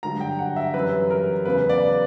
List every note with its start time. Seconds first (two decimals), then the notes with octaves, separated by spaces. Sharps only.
0.03 G2 D3 F#3 A#5
0.20 G5
0.39 F#5
0.56 E5
0.74 F#2 E3 G3 B4
1.10 A#4
1.45 E2 C#3 F#3 B4
1.69 D5